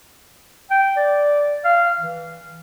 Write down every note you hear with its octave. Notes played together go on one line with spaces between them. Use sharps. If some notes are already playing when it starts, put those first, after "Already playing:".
G5
D5
F5
E3